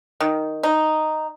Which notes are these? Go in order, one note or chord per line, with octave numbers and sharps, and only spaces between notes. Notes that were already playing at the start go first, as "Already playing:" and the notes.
D#3
D#4